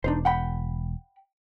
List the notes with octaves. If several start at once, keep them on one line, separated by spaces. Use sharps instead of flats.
E1 D4 D#4 C5
F#5 G5 B5